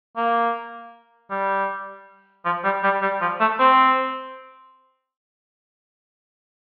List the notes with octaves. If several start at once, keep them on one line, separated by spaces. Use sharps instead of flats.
A#3
G3
F3
G3
G3
G3
F3
A3
C4